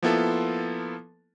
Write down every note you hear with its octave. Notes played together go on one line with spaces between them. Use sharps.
F3 A#3 B3 E4 F4 A4